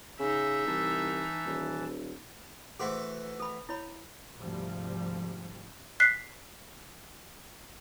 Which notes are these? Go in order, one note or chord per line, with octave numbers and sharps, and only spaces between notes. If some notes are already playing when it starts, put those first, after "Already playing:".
C#3 D#4 E5
C2 E3 A5
D#1
E3 A3 F#4 G#4 C5 C6
A4 B5
E4 C#5 B5
G#1 D2 C3 F3 G3
F#6 B6 C7